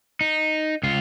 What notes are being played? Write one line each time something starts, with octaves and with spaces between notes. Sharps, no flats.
D#4
C#2 F4